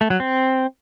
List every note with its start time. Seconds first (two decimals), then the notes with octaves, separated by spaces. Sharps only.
0.01 A3
0.10 F#3
0.20 C4